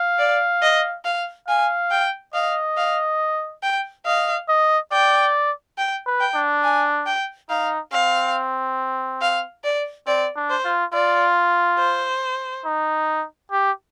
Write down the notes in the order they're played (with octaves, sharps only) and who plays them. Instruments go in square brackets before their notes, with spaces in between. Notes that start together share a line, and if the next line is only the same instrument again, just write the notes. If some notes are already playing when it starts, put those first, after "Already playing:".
Already playing: [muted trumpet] F5
[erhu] D5
D#5
F5
[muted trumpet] F5 [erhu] G#5
[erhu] G5
[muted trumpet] D#5 [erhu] F5
[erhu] F5
G5
[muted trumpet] D#5 [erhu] F5
[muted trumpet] D#5
[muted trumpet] D5 [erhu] G5
[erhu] G5
[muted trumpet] B4
[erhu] G5
[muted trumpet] D4
[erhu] G#5
G5
[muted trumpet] D#4 [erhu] F5
[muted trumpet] C4 [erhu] F5
[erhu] F5
D5
[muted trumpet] C4 [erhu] D5
[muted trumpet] D4
[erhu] C5
[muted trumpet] F4
[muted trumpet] F4 [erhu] D5
[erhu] C5
[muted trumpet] D#4
G4